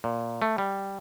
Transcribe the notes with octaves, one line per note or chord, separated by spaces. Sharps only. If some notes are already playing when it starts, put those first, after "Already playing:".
A#2
A3
G3